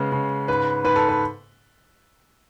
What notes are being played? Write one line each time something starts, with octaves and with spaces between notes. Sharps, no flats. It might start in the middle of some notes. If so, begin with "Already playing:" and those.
Already playing: C#3 G#3 B3
C#3
G#2 B4
G#2 B4
A4
B4